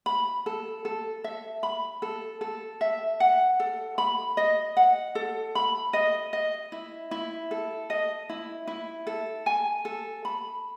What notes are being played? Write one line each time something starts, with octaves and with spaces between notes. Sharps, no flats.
B5
A4
A4
E5
B5
A4
A4
E5
F#5
A4
B5
D#5
F#5
A4
B5
D#5
D#5
E4
E4
A4
D#5
E4
E4
A4
G#5
A4
B5